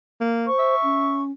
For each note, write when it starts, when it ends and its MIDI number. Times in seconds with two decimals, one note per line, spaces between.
0.21 0.48 58
0.47 0.75 72
0.47 1.22 85
0.59 1.20 76
0.83 1.31 61